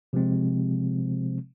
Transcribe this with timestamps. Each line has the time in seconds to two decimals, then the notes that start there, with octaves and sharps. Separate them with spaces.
0.13 C3 F3 G#3 C4